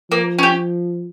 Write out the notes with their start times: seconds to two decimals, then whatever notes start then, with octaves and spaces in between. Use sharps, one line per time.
0.11 F3 A#3
0.39 C#4 G4